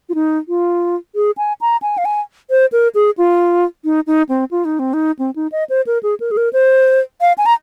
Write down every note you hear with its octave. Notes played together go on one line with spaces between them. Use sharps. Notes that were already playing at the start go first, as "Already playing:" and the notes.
F4
D#4
F4
G#4
G#5
A#5
G#5
F5
G#5
C5
A#4
G#4
F4
D#4
D#4
C4
F4
D#4
C4
D#4
C4
D#4
D#5
C5
A#4
G#4
A#4
G#4
A#4
C5
F5
G#5
A#5